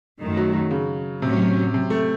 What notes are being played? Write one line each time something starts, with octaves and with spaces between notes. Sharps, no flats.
F#2 D#3 A3
F#3
F#3
C#3
A2 C3 F#3 C#4
C3
A3